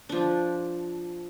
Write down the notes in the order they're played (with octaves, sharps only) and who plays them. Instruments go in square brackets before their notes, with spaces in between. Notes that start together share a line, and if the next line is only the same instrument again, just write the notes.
[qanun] F3 D4